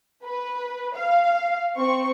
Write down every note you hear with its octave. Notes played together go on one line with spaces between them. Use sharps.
B4
F5
C4 C#6